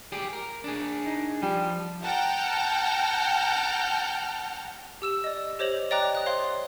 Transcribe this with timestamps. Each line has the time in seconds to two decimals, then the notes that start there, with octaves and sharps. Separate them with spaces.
0.12 G4 G#4 D5
0.33 A#4
0.64 D4 G#4
1.06 D#4
1.42 F3 G3
2.03 F#5 G5 A5 A#5 F6 G6
5.02 G4 E6 E7
5.24 D5 D#5
5.59 G4 C5 C#5 D#5 F7 F#7
5.91 D5 D#5 G5 A#5 D6 F#6
6.15 D#6 F#6
6.26 C5 C#5 F5 C6 F#6